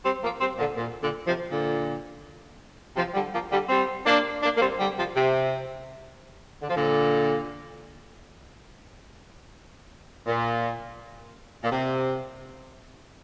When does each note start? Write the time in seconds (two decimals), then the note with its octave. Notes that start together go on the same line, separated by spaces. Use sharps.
0.05 G3 C4
0.23 F3 A#3
0.41 G3 C4
0.59 A#2 D3
0.77 A#2
1.02 A#2 D3
1.26 C3 F3
1.51 A#2 D3
2.96 C3 F3
3.14 D3 G3
3.33 F3 A#3
3.51 D3 G3
3.69 G3 C4
4.06 A#3 D4
4.42 A#3 D4
4.57 A#3
4.61 G3 C4
4.79 D3 G3
4.96 C3 F3
5.15 C3
6.62 D3
6.69 F3
6.75 A#2 D3
10.26 A#2
11.63 A#2
11.72 C3